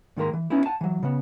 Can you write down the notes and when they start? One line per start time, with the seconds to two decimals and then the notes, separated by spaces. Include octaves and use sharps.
0.17 G#2 D#3 G#3 A#3 A#4 C6
0.33 E3
0.50 B3 C#4 D#4 E4
0.66 F#5 A5
0.81 E3 F#3
1.03 C#3 B3